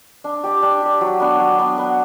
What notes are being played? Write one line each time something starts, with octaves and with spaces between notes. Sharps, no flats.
D4
G4 D5
D4
G4 D5
F#3
B3 D4
F#3
B3 D4
B3